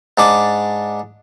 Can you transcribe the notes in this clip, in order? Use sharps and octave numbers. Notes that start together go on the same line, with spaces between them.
G#2 D4 D6